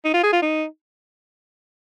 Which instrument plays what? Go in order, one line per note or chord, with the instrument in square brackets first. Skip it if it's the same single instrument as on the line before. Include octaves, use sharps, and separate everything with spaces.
[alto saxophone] D#4
F4
G#4
F4
D#4